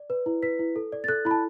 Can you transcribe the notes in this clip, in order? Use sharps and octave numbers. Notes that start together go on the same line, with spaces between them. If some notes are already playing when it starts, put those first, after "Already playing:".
Already playing: D5
B4
E4
B4 B6
E4
A4
D5
A6
A4 F#6
E4 B5
A5